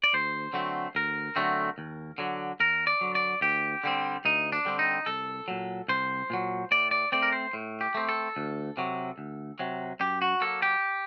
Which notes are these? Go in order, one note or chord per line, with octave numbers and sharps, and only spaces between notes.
D5
D2 C5
D3 F#3 A3 C4
D2 A#4
D3 F#3 A3 C4
D#2
D3 F#3
D#2 A#4
D5
D3 F#3
D5
D2 G4
D3 G3 C4
D2 D#4
D4
D3 G3 C4
D#4
C2 A4
A#2 F#3
C2 C5
A#2 F#3
A2 D5
D5
A3 C4 D5
A#4
C5
A2
G4
A3 C4
A4
D2
C3 F#3
D2
C3 F#3
F#2 G4
F#4
F#3 A#3 A4
G4